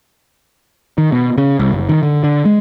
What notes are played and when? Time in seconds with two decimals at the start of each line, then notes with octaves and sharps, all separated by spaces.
0.98 D#3
1.12 B2
1.38 C#3
1.59 C2
1.72 F#1
1.89 D#3
2.03 D3
2.24 D3
2.45 G#3